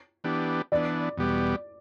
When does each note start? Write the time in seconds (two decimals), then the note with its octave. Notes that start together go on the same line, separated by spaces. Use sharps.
0.24 E3 B3 D4 G4
0.72 E3 B3 D4 D5
1.17 E2 B2 G3 B3 G4